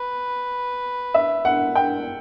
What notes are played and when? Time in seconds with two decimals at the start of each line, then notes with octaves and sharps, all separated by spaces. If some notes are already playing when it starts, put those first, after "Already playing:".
Already playing: B4
1.14 E5
1.45 F#5
1.75 G5